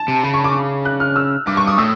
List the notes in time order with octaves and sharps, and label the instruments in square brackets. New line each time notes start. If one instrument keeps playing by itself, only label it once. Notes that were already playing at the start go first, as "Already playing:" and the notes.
Already playing: [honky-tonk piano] A5
[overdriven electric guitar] C3
[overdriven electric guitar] C#3 [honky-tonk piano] B5
[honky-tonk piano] C#6
D6
F#6
F6
E6
[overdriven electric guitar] G2 [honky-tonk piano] D6
[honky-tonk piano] C#6
D#6
[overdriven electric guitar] A2 [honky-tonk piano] E6